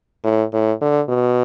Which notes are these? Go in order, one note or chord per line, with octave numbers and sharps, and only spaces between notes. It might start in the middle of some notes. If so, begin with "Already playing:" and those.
A2
A2
D3
B2